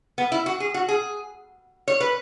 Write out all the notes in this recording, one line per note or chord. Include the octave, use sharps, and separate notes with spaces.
B3
E4
F#4
G#4
F#4
G#4
C#5
B4